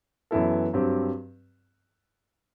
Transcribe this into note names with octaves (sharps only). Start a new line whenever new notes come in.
F#2 E3 B3 E4 A4
G2 F#3 C4 G4